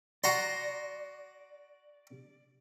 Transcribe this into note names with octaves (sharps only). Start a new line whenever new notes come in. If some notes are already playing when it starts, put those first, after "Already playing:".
F#4 D5 A#5 C6